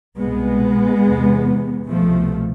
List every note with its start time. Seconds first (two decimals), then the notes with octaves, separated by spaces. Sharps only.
0.18 C2 B2 G#3 B3
1.05 E2 C3
1.90 C2 B2 F3 A3